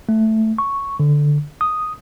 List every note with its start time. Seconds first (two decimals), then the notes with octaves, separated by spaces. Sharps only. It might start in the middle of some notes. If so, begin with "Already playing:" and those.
0.09 A3
0.58 C#6
1.00 D3
1.61 D#6